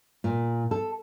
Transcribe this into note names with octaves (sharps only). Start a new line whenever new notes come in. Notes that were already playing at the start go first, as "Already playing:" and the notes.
A#2
A4